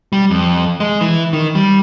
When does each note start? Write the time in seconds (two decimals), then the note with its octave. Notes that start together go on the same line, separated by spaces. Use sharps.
0.13 G3
0.31 F2
0.80 G#3
1.01 E3
1.33 D#3
1.55 G3